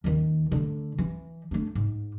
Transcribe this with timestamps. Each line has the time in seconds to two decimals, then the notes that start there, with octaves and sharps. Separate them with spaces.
0.04 D#2 D#3
0.52 D3 A3
0.98 E3
1.51 A3 D4
1.75 G#2